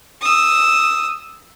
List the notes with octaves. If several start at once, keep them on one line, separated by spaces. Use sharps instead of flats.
D#6 E6